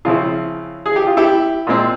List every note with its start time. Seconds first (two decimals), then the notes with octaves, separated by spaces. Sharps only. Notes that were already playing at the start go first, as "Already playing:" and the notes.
0.05 C#3 F3 C4 E4 F4
0.86 G#4
0.96 G4
1.07 F4
1.17 E4 G4
1.67 A#2 G#3 C4